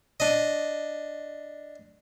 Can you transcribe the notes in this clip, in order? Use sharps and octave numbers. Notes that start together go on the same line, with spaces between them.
D4 D#5